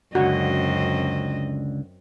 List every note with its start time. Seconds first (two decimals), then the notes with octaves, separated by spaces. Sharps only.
0.15 C#2 F#2 D3 C4 F#4 D#5